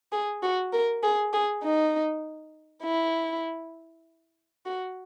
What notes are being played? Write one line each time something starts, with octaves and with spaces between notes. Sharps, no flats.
G#4
F#4
A#4
G#4
G#4
D#4
E4
F#4